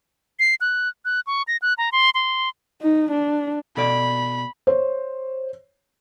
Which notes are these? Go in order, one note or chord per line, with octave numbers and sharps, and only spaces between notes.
C7
F#6
F#6
C#6
A#6
F#6
A#5
C6
C6
D#4
D4
B2 A4 D5 B5
C5 C#5